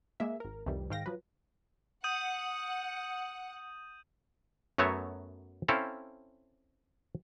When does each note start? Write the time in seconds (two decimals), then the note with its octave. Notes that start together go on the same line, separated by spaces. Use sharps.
0.20 G#3 A#3 E5
0.40 G#1 A#4
0.66 C2 F2 D#3 E3 G3
0.90 G#2 D#3 F5 G5 A#6
1.06 F3 F#3 B4
2.04 F#5 D#6 G6 D#7
4.78 F#2 F#3 A3 B3 C#5 E5
5.68 C4 C#4 E4 A4 F5